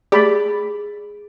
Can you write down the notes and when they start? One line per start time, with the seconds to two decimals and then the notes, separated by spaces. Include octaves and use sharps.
0.12 A3 G4 G#4 D5 B5